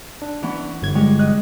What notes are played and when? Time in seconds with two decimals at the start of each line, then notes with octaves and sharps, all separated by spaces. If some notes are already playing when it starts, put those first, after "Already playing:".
0.22 D4
0.42 E3 B3 C#4
0.82 G1 G#6
0.95 G3 G#3 C#4
1.19 D#5 F#6